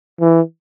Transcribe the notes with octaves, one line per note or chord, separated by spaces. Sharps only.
E3